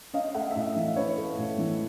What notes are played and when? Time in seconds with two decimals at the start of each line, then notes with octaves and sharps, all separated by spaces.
0.13 C#4 D#5 F5
0.35 A3 E5 F#5
0.51 E5
0.55 A2 D#5 F5
0.76 E3
0.96 C#4 B4 C#5
1.17 A3
1.38 A2
1.58 E3